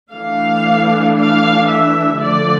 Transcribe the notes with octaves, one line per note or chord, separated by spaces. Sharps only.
E3 A3 D4 F5
F5
E5
D3 F3 A3 D5